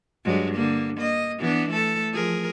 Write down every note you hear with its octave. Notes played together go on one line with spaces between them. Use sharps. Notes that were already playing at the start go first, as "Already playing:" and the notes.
G2 F#3 G#3
D3 A#3
A#3 D#5
E3 B3 D4
A3 A4
F3 G#4 A#4